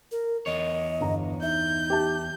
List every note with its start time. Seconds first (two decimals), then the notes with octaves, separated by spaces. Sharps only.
0.12 A#4
0.46 E2 C#5 D#5
1.00 G1 A#5
1.43 D#4 E5 G6
1.90 G4 E5 A5